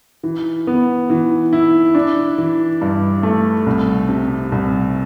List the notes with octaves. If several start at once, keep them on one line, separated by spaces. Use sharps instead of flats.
E3
B3
E3
E4
D4
E3
G2
A3
C2
C3
C2